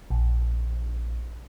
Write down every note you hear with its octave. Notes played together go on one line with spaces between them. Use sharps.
A#1